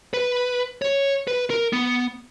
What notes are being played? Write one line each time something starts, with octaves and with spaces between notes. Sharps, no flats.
B4
C#5
B4
A#4
B3